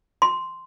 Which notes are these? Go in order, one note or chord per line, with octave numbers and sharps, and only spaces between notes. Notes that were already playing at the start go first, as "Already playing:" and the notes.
C6